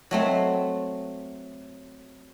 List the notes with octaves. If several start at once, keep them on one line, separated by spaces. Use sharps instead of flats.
F#3 A3 C4